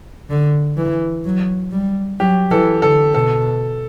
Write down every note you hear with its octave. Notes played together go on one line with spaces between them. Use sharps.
D3
E3
F#3
G3
F#3 G4
E3 A4
D3 A4
B2 A4